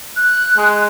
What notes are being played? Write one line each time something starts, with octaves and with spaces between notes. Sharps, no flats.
F#6
G#3